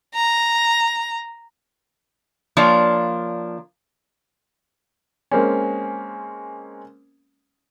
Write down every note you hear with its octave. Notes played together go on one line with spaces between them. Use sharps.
A#5
F3 A#3 D4 C#5 D5
G#3 A#3 C4 C#4